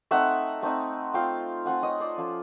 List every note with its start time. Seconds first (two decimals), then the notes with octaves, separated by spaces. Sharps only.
0.11 A3 C4 D#4 E5 F#5
0.62 A3 C4 D#4
1.14 A3 C4 F4 F5 G5
1.66 A3 C4 F4 F#5 G#5
1.83 C#5 D#5
2.00 C5 D5
2.18 F3 A3 C#4 F4